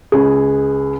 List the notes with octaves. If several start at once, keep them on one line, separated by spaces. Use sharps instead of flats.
C#2 G#4